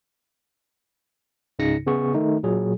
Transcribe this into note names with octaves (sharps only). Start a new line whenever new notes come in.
C#2 G#2 C#3 D#4 A#6 C#7
C#3 B3 G#4 C#6
D#3 A3 D#4
A#2 F#3 G#4